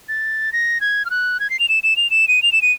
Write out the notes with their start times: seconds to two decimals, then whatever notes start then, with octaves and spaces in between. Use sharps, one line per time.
0.09 A6
0.53 A#6
0.81 G#6
1.05 F6
1.10 F#6
1.40 G#6
1.50 C7
1.60 F7
1.69 E7
1.83 E7
1.97 F7
2.11 E7
2.28 D#7
2.43 F7
2.52 E7
2.62 D#7